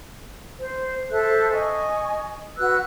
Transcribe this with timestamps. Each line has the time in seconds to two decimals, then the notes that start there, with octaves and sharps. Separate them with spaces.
0.59 C5
1.11 A4 C5 E5 F#6
1.52 D#5 G#5 C#6
2.58 F#4 B4 E6 F#6